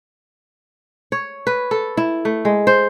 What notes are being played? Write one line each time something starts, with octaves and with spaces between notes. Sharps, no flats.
C#5
B4
A4
E4
A3
G#3
C5